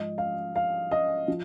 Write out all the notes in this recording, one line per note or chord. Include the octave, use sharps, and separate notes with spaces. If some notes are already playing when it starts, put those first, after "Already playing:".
Already playing: G#2 F3 D#5
F5
F5
D#5
F3